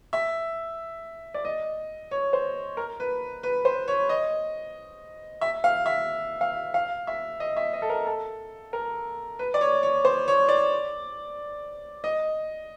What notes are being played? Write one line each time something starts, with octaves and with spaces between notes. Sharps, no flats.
E5
D5
D#5
C#5
C5
A#4
B4
B4
C5
C#5
D#5
E5
F5
E5
F5
F5
E5
D#5
E5
D#5
A4
A#4
A4
A#4
B4
D5
C#5
C#5
C5
C#5
D5
D#5